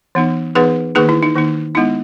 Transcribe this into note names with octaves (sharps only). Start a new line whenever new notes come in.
E3 B3 D#4
E3 B3 D#4 G#4 B4
D#3 A#3 D#4 G#4 B4
E4
D#4
D#3 A#3 D#4
G#3 B3 D#4 E4